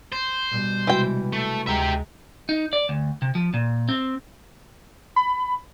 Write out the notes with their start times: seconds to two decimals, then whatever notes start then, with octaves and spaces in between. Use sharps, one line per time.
0.12 C5
0.51 B2 G3
0.87 C3 E3 G#3 F#4 G5
1.33 A3
1.67 D2 G#3 G4 E5 A#5
2.49 D#4
2.73 D5
2.89 D2
3.22 C3
3.35 F3
3.54 A#2
3.89 C4
5.16 B5